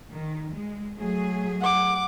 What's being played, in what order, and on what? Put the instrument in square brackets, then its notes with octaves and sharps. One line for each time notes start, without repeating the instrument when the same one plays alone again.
[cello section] D#3
G#3
F#3 A3 G#4
[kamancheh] F#5 D6